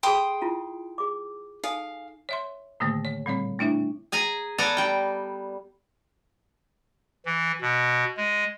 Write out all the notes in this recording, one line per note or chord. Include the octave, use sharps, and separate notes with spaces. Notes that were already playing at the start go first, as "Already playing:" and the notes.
G#4 A4 G5 B5 C6 D#6
E4 F4 A5
G#4 D6
D#4 A4 F5 G#5
C#5 E5 C6
A2 D3 D#3 A3 A#3
C#5
A#2 G3 C4 C#5
A3 D4 E4 E5
G#4 G#5 A#5
B3 A4 D5 G#5 A#5
G3 G5
E3
B2
G#3